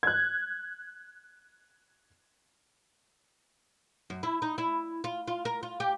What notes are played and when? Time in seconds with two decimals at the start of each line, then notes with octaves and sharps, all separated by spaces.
0.03 F#6 G#6
4.10 F#2
4.23 E4
4.42 D#4
4.58 E4
5.04 F4
5.27 F4
5.45 A#4
5.63 F4
5.80 G4